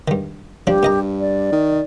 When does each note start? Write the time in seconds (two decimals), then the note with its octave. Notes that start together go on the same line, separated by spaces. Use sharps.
0.08 G2 D#3
0.67 G2 F3 D4 G4
0.83 A#2 D#5 A#5
1.20 D5
1.52 D#3